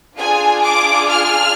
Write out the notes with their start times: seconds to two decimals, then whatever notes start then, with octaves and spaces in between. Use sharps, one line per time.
0.16 D4 F4 G#4 G#5
0.63 D6
1.09 F6